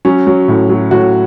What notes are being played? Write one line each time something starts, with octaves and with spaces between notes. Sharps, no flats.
F#3 C#4
F#3
A2
F#3
A2 F#4